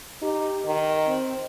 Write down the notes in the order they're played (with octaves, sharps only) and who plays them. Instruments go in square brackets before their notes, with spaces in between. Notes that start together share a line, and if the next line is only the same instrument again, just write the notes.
[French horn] D#4 [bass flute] G4
[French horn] D#3
[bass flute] C4